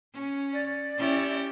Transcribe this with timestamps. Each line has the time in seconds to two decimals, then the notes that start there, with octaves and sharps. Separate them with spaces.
0.13 C#4
0.53 D5
0.97 C#4 E4 G4